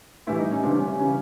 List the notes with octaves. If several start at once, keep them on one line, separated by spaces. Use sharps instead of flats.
A2 E3 G3 E4
D#4
C#4
C#2 C3 E3 G3 D4
C#4
C#4
C#3 E3 G3 C#4